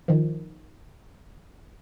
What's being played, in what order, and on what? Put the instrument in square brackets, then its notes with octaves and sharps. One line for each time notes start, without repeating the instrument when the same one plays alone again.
[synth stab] D#3 F3